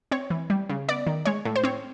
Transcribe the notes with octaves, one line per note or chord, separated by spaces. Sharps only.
C4 C#5
E3
G3
C#3
B3 D5
D#3
G#3 C#5
A2
C5
C4 C#5